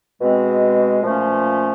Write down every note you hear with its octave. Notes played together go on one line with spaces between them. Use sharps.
B2 G#3 C4
A#2 F3 A3 C#4